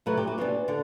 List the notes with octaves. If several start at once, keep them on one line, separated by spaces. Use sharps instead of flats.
C3 F#3 A3 B4
G4
F#4
C3 E3 B3 D4
D3